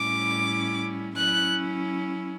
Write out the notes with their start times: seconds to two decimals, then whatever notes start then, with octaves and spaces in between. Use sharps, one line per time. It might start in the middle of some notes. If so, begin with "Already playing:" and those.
Already playing: A2 G3 C#4 E4 D6
1.16 F#3 C#4 E4 F#6